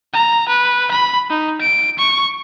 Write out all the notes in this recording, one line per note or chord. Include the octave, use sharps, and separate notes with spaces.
A#5
B4
B5
D#4
D7
C#6